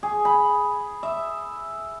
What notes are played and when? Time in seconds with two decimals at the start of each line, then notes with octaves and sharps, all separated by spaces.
0.03 G#4
0.25 B5
1.03 E5